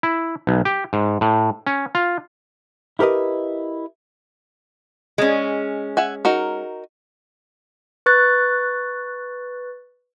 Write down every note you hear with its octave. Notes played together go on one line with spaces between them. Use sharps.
E4
B1
G4
G#2
A2
C#4
F4
E4 G4 A#4 B4 D#5
G#3 C#4
E5 F#5 G#5
D#4 F#4 A#4
B4 C#6 F#6 A6